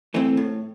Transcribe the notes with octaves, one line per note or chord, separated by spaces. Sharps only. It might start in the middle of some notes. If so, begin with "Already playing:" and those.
E3 A3 C4
A2